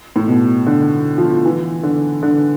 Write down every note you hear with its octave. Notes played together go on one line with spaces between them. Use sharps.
A2
B2
D3
F3
E3
D3
D3